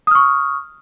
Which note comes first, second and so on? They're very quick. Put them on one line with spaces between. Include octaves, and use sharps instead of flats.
D#6 F6 C#6